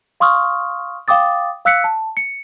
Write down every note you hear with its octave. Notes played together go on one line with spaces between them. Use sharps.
F5 C6 C#6 D#6 F6
F5 G5 D6 D#6 A6
F5 E6 F#6 B6 C#7
A5
C#7